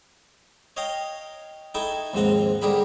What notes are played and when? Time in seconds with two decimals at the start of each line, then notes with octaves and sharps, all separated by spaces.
0.77 C#5 D#5 F5 G5 A#5
1.74 D#4 E4 A4 G5 G#5 C#6
2.14 D#2 G#2 F3 C4 F#5 A#5
2.62 D3 G3 G4 G#4 A#4 B5